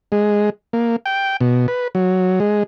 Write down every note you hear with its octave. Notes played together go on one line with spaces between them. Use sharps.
G#3
A#3
G5
B2
B4
F#3
G#3